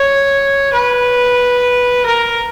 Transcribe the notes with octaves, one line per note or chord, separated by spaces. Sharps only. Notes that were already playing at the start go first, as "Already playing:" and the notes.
Already playing: C#5
B4
A#4